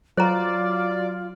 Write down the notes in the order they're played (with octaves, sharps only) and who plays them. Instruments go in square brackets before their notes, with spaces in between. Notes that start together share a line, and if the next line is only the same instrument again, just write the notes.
[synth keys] F#3 [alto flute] F4 [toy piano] C5 A#5 [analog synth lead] D5